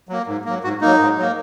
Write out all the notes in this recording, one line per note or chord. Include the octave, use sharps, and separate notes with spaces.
F#3 A#3
G#2
F#3 A#3
G#2 F#4
F#3 A#3 D#4
G#2
F#3 A#3